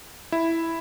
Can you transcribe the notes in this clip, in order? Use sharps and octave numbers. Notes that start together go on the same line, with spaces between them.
E4